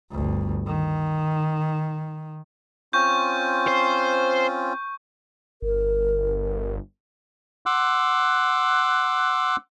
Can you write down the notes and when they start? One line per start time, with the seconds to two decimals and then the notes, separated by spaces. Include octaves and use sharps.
0.11 G1 D2
0.66 D#3
2.93 C4 C#4 F4 C#6 G6
3.68 C5
5.62 G1 A#4
7.66 F#5 C6 D6 E6 F#6